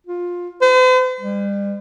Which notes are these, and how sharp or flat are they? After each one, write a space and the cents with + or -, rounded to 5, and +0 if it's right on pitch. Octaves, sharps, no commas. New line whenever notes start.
F4 +15
C5 -45
G3 +40